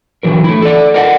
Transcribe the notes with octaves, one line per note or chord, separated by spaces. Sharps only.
D3 E3 F#3 A#4
A3 E4
A4 D5
A#4 D5 D#5 F#5